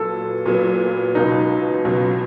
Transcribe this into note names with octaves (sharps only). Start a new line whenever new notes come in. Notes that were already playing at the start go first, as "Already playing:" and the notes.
Already playing: A#2 F#3 B3 A4
A#2 F#3 B3
C#2 B2 F#3 B3 D#4
C#2 B2 F#3 B3